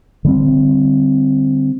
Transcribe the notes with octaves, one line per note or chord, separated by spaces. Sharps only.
D3 G3 C4